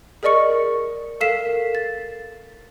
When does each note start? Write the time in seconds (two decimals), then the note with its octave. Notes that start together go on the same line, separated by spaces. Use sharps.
0.23 G#4 A#4 D5 D#5 C#6 C#7
1.21 A4 A#4 F5 B6 C7 E7
1.75 A6